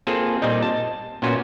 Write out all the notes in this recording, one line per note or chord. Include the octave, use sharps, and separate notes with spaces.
A#3 C4 F4 G#4 A4
A#2 G3 C4 D#4 D#5
A5
A#2 B3 C#4 F4 F#4